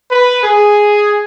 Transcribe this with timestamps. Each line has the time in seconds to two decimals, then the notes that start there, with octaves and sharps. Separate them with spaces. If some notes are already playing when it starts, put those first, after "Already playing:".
0.11 B4
0.43 G#4